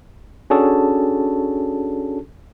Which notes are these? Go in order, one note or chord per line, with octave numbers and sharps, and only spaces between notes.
C#4 D4 F#4 G#4 A4 A5